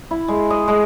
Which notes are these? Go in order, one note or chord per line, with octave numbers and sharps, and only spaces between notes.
E4
G#3
D#5
G#3